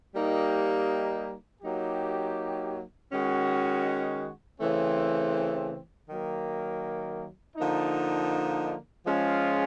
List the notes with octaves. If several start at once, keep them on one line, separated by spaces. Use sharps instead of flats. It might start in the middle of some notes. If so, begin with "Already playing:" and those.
G3 A#3 D#4 G4
F#3 A#3 D#4 G4
D#3 G#3 C#4 F#4
C#3 E3 A3 C4
D#3 F#3 A#3
D3 F3 A#3 D#4
F3 G#3 C#4 F4 G#4